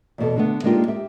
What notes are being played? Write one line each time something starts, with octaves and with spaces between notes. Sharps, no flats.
E2 B2 A4
D3 A3 B3
G#3 A#3 D4 D#4 F4 G4
G4 E5